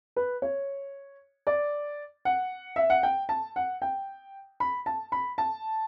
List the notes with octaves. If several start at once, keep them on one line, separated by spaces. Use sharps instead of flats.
B4
C#5
D5
F#5
E5
F#5
G5
A5
F#5
G5
B5
A5
B5
A5